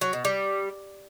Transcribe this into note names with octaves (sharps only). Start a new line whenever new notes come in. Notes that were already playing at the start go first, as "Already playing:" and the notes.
F#3
B2
G3